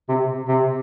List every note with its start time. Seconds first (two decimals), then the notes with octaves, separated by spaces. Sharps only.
0.09 C3
0.48 C3